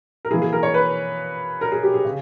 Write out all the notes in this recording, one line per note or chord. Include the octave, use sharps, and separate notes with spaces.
A#4
E3 A#3 E4 G#4
G#4
A#4
C#5
B4
A#4
G#4
G4
G#4
C#3